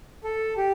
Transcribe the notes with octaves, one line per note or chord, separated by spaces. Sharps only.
A4
G4